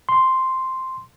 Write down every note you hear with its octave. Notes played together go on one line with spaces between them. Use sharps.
C6